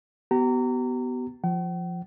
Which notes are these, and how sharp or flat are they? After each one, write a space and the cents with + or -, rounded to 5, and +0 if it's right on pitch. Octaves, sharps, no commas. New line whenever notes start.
B3 +10 G4 -45 A#5 -25
F3 +0 F#5 +45